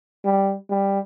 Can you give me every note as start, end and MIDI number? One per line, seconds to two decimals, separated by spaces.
0.25 0.55 55
0.70 1.00 55